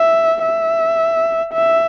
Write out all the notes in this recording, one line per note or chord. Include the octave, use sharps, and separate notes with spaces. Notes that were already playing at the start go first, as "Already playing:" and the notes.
Already playing: E5
E5
E5